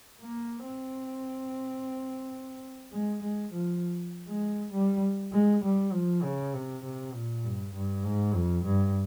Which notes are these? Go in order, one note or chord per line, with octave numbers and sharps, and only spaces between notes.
A#3
C4
G#3
G#3
F3
G#3
G3
G#3
G3
F3
C#3
C3
C3
A#2
G2
G2
G#2
F2
G2